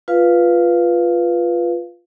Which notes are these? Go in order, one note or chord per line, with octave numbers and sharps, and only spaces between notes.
F4 B4 F5